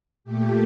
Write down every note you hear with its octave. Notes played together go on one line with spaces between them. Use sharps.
A#2 A3 G4